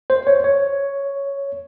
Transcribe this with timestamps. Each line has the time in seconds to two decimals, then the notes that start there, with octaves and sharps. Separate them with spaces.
0.10 C5
0.27 C#5
0.44 C#5